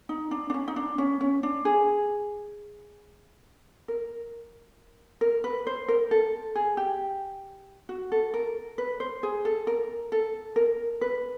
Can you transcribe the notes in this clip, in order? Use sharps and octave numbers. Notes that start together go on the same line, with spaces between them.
D#4
D4
D4
C#4
D#4
D4
C#4
C#4
D4
G#4
A#4
A#4
B4
C5
A#4
A4
G#4
G4
F#4
A4
A#4
B4
C5
G#4
A4
A#4
A4
A#4
B4